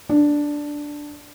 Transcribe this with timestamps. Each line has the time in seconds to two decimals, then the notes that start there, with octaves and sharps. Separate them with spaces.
0.09 D4